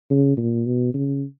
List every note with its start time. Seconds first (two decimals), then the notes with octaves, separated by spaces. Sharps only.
0.10 C#3
0.37 A#2
0.66 B2
0.94 C#3